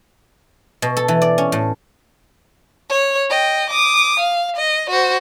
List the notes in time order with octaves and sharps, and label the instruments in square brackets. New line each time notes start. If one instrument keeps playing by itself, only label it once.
[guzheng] B2
A4
E3
D5
C#4
A2
[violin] C#5
D#5 G5
D6 D#6
F5
D#5
F#4 C5